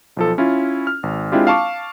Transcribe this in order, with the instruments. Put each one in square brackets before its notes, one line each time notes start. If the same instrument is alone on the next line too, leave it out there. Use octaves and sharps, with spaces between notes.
[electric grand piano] B1 F3 A4
C#4 E4 F4
F6
G#1
G#3 C4 D4 E4 F4 G4
F5 A5 C#6 D6